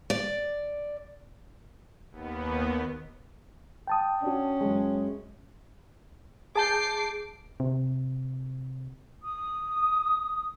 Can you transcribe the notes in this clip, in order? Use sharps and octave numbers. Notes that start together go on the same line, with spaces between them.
D5
D#2 B3
G5 A5 D#6
C#4 D4 F#4
F#2 G#3
G#4 A5 D6 G6 C7
C3
D#6